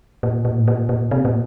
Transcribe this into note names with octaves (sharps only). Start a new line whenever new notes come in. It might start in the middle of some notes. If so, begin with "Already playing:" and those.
A#2
A#2
A2
A#2
A#2
C3
A#2